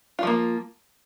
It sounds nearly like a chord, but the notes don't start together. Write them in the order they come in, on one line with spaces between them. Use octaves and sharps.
F4 F3 A#3